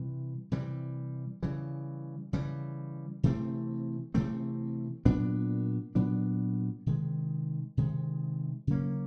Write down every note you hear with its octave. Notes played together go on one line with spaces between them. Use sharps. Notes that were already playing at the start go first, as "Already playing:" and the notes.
Already playing: C3 E3 G3
C3 E3 G3
C#3 E3 G3
C#3 E3 G3
C3 E3 A3 C4
C3 E3 A3 C4
A#2 F#3 B3 D4
A#2 F#3 B3 D4
C3 D#3 G#3
C3 D#3 G#3
C#3 F#3 A#3 C#4